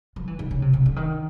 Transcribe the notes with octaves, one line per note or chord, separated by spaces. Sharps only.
F3
E3
D#3
C#3
C3
C3
D3
D#3